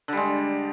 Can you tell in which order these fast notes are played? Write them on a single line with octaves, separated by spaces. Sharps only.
D3 G3 G#3